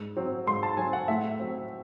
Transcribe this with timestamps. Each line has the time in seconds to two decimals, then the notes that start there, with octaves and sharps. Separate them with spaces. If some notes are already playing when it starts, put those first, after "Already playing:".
Already playing: G#2
0.17 F#3 C4
0.47 G#2 C6
0.63 A5
0.77 F#3 C4 G#5
0.93 F#5
1.08 A2 E5
1.39 F#3 C4